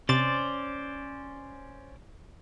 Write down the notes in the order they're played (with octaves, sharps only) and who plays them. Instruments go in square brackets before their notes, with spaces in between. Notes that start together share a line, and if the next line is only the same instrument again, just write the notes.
[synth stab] C3 A6 [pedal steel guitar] C#4 C5 D5